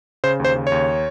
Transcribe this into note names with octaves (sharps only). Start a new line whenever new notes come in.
C#3 C5
D#2 C5
C#3
C#5
D#2